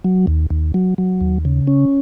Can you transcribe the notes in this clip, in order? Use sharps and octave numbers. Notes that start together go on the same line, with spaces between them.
F#3
D#2
D#2
F#3
F#3
D#2
C#3
C#4